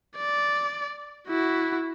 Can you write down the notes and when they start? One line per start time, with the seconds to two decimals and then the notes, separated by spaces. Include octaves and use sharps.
0.17 D5
1.29 E4 F#4